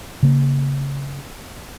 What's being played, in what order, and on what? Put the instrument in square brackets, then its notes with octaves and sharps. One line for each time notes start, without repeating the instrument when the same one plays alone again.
[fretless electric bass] C#3 A#3